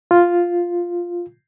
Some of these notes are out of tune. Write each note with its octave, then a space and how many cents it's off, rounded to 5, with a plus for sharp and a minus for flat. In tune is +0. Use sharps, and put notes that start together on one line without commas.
F4 +0